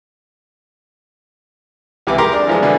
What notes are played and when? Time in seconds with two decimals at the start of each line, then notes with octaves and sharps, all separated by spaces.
2.07 C#2 C3 E3 D6
2.18 G4 G#4 A#4 A#5 C6 D6
2.33 D4
2.47 E3 F3 G#3
2.62 B2 D3 E3